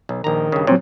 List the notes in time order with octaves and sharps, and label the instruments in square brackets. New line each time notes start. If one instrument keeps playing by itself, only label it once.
[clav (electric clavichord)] B1
[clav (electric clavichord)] A#1 A#5 [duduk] D#3
[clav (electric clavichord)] G2 C#3
[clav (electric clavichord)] A#2 [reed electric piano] F#3 C4 C#5